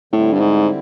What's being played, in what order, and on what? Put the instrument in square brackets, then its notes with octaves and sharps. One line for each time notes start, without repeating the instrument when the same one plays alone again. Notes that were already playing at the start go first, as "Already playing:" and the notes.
[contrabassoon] A2 [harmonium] D3 G3 C4 E4
[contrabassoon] G2
G#2